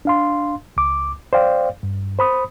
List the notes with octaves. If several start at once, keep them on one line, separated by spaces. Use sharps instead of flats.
D4 F5 C6
C#2 D6
C5 D5 F5 G5
G2
C5 B5 D#6